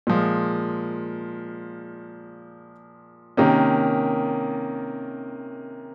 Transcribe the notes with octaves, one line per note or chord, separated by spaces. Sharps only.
A#2 F3 G#3
C3 D#3 A#3 C#4